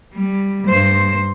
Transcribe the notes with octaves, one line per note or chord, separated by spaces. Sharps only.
G3
G2 C5